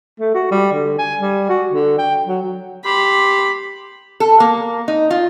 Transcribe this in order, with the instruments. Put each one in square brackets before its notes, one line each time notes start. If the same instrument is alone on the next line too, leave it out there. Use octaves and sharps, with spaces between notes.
[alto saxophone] A3
F#4
G3
D3
G#5
G3
F#4
D3
G5
F#3
[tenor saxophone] G4 [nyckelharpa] B5 [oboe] C6
[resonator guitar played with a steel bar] A4
A#3
D#4
F4